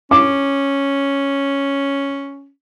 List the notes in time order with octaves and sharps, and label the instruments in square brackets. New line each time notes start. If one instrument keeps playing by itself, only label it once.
[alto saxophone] C#4 [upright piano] D6